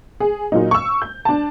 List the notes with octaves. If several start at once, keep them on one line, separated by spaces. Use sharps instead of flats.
G#4
A#2 F#3 D#4
C#6 E6
G6
D4 A5